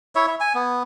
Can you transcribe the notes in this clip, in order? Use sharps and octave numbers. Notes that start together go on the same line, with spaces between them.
E4 C#5 E5
E5
G#5
B3